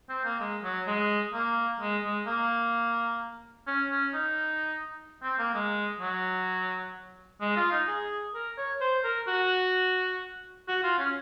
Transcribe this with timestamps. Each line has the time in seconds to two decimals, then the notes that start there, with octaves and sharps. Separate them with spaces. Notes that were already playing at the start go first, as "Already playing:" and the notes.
0.09 C4
0.25 A#3
0.40 G#3
0.63 F#3
0.87 G#3
1.33 A#3
1.80 G#3
2.04 G#3
2.26 A#3
3.67 C#4
3.91 C#4
4.14 D#4
5.22 C4
5.39 A#3
5.54 G#3
6.00 F#3
7.41 G#3
7.56 F4
7.71 D#4
7.88 G#4
8.34 A#4
8.58 C#5
8.81 C5
9.04 A#4
9.28 F#4
10.68 F#4
10.83 F4
10.99 C#4